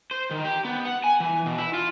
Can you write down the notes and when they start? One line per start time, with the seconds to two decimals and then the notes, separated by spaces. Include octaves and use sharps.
0.11 C5
0.31 D#3
0.45 G4
0.65 B3
0.85 F#5
1.04 G#5
1.20 E3
1.46 B2
1.58 E4
1.74 F4